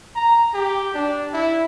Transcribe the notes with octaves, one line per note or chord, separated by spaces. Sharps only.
A#5
G4
D4
E4